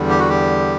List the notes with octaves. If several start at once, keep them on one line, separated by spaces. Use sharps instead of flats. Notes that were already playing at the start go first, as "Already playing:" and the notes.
Already playing: E2 D3 G3
G4
F#4
G4